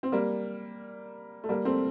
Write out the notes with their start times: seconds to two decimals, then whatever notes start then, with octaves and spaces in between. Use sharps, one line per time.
0.03 C4
0.12 G3 A#3
1.44 A3
1.49 G3 A#3
1.65 A3 C4